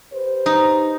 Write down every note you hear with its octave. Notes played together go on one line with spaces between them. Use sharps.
G4 B4 C5
D#4